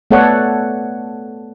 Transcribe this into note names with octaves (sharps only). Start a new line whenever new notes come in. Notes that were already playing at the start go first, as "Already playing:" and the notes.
A3 B3 A4 C#5 D5 F#5